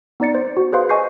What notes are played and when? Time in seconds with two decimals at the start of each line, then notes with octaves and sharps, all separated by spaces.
0.20 B3 D#4 D5 A6 C#7
0.35 C5
0.57 F#4
0.72 G#4 B4 C5 F5 C6
0.89 D#5 G#5 C#6 G6 C7